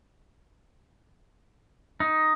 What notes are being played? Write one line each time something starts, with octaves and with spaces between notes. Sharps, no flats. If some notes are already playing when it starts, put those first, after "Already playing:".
D#4